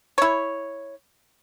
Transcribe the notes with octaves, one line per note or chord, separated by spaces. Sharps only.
E4 C#5